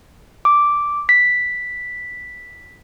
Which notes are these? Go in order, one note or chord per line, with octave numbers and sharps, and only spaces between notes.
D6
B6